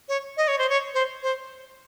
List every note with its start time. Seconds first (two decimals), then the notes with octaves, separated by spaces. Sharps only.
0.09 C#5
0.37 D#5
0.48 C#5
0.59 C5
0.69 C#5
0.94 C5
1.23 C5